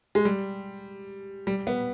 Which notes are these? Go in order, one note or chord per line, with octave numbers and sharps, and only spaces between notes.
G#3
G3
G3
B3